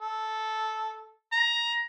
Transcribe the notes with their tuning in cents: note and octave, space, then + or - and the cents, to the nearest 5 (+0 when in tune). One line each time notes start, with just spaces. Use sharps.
A4 -10
A#5 +15